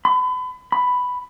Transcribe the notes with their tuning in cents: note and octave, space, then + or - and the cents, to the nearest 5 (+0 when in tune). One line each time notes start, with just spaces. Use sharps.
B5 +35
B5 +5